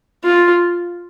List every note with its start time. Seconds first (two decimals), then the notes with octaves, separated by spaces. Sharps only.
0.24 F4